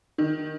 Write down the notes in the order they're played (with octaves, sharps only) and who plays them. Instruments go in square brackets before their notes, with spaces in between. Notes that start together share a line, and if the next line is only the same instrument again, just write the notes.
[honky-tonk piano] D#3